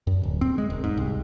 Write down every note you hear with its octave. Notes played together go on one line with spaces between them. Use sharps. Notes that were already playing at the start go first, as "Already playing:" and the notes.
F#2
D1
C4
G#3
E1
G#2
C2